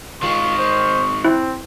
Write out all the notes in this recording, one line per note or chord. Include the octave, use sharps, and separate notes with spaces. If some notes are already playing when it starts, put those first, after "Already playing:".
D#3 G#3 F4 C#6
C5
C4 E4